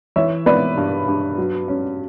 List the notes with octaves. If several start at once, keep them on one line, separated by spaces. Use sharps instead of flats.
E3 C#5 E5
B3 B4 D5
G2
G2
F#3
C#4